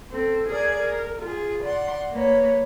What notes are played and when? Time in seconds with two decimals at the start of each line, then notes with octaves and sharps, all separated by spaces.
0.10 C4 A4
0.48 G#4 A#4 D5 G#6
0.79 A#4
1.22 F4 G#4
1.62 D5 F#5 C6
2.11 A#3 B4 C#5